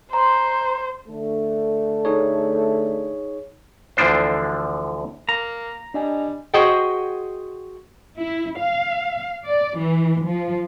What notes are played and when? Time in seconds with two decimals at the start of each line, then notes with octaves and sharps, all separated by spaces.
0.13 C5 A#5 C6
1.09 D3 A3
2.05 D#4 G#4 C#5
3.97 D2 D3 E3 F3 D4 C5
5.29 A#3 A#5
5.94 G3 D4 D#5 G#5
6.54 F#4 G#4 C5 D#5 F#5 G5
8.18 E4
8.59 F5
9.44 D5
9.79 E3
10.26 F3